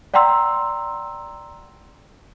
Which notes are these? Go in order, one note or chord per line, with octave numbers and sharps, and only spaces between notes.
D5 F#5 G5 A#5 C6 E6